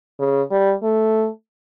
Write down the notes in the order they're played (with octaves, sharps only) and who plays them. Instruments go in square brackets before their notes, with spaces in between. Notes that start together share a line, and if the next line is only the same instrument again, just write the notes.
[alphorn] C#3
G3
A3